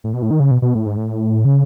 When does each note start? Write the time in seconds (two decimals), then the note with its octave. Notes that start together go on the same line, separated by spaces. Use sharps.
0.04 A2
0.14 B2
0.22 A2
0.31 D#3
0.40 C#3
0.51 B2
0.62 B2
0.75 A2
0.86 G#2
0.97 A2
1.45 C#3